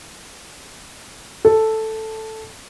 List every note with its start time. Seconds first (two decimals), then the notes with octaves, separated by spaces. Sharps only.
1.45 A4